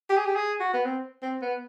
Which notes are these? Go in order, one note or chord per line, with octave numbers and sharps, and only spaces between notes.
G4
G#4
G4
G#4
F#4
B3
C4
C4
B3